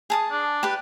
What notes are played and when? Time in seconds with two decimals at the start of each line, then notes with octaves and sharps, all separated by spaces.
0.10 G#4 A5 D#6
0.31 D4
0.63 G4 B4